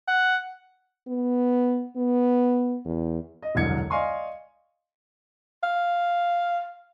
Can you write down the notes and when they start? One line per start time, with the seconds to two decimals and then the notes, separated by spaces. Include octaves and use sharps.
0.08 F#5
1.08 B3
1.97 B3
2.85 E2
3.42 D#5
3.55 E1 C2 F#2 D3 G#6 C#7
3.90 D5 D#5 F5 G#5 C6 C#6
5.63 F5